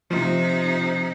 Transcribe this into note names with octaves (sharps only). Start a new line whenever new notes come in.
C3 F3 D#4